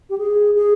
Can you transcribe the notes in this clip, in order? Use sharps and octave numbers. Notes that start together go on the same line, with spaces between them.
G4
G#4
G#4